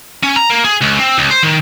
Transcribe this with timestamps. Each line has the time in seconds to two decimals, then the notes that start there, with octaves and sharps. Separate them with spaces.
0.23 C#4
0.36 A#5
0.50 A#3
0.65 G#4
0.82 C#2
1.00 C4
1.18 C#2
1.31 C5
1.43 D#3